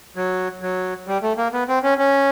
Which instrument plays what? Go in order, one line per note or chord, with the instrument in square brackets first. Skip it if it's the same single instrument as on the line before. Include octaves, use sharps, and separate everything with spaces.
[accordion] F#3
F#3
G3
A3
A#3
B3
C4
C#4
C#4